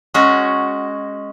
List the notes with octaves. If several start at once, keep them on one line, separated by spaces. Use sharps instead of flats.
G#3 C#4 F#4